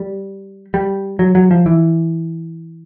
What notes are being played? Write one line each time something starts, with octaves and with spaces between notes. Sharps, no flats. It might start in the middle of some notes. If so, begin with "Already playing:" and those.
Already playing: G3
G3
F#3
F#3
F3
E3